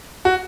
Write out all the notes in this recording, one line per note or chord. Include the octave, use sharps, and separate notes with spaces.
F#4